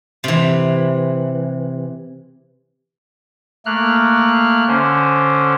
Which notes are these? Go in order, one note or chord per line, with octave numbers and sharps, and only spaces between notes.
C3 E3
A3 A#3 F6 F#6
D3 C#4 C5